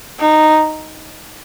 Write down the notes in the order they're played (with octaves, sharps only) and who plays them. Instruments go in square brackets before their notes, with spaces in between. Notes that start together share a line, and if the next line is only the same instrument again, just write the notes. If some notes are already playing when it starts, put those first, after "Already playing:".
[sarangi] D#4